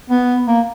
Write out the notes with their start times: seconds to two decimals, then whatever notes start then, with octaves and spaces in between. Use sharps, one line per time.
0.11 B3
0.47 A#3